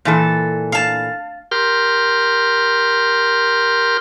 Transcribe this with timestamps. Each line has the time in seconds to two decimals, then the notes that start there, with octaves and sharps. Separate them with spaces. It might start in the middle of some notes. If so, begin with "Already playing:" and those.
0.05 A#2 E3 A4
0.72 F5 A5
1.51 G4 A#4 C6 F6 G6